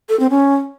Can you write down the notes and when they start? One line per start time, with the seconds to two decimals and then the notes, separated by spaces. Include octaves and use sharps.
0.09 A4
0.20 C4
0.30 C#4